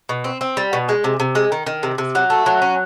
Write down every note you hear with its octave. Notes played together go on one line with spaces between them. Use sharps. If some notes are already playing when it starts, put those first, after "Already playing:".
B2
C4
C4
G3
B2
G#3
C3
C3
G#3
D#3
D#3
C3
C3
F#3
A3
F#3
C#4